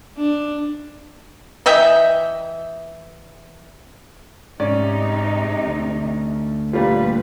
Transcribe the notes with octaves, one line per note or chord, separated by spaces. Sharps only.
D4
E3 D#5 E5 G5
G#2 C3 C#4 D#4 D5
D2
A#2 G3 F4 B4